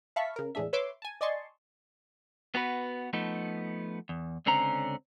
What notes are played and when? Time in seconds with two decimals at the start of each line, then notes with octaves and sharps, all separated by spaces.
0.16 E5 F5 A5 B5 C#6 B6
0.36 C#3 A#4
0.55 E2 A2 G#3 D4 E5
0.73 B4 C#5 E5 C6 D6
1.02 G#5 A5
1.21 D5 D#5 G#5 A5 C6 C#6
2.55 B3 F#4 B4
3.13 F3 A3 B3 D#4
4.09 E2
4.46 C#2 D3 C4 C#4 A#5